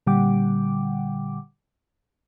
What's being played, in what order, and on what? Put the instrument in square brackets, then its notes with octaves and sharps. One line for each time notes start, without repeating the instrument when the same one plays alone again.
[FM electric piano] A#2 D3 G3 F#5 G5 D6